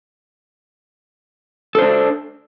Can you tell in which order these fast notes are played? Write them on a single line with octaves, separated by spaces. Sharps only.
A4 C5 D4